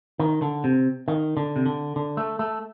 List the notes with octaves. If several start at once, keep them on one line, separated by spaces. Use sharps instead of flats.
D#3
D3
C3
D#3
D3
C3
D3
D3
A3
A3